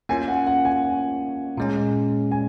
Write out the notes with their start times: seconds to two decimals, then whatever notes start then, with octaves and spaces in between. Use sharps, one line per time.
0.09 A#3 C#4 F4 G#5
0.28 F#5
0.47 F#5
0.65 G#5
1.57 A#2 G#3 C#4
2.31 G#5